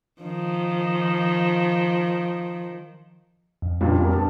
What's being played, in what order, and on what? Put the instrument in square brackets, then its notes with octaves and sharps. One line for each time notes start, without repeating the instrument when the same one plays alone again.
[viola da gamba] D#3 F3
[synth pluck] F2
[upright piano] C#2 G2 A#2 [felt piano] G3
[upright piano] E1 F#4 A#4
G2 A5